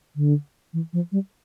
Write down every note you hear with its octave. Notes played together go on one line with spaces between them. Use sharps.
D3
E3
F3
G3